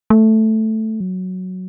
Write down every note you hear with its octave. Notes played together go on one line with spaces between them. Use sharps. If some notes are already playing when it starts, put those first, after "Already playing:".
A3
F#3